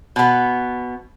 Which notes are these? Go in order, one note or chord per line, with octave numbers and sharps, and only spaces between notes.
B2 B3